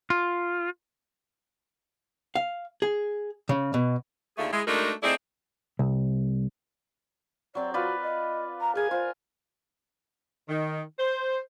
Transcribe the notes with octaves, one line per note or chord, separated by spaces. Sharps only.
F4
F5
G#4
C#3
B2
D#2 D3 A3 F4 G#4
G#3 E4 G#4
G#3 A3 D4 D#4 F#4 A#4
A3 C4 D#4 E4 G#4 D5
C2
F#3 C4 D5
F4 F#4 B4 D5
D#5
A#5
G#4 A#4 G#5
F4 C5
D#3
C5